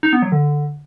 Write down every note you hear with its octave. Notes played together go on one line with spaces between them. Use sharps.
D#4
B3
F#3
D3